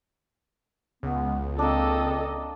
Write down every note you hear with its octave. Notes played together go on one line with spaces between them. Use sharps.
C#2 B3
A#3 C4 D4 A4 D#5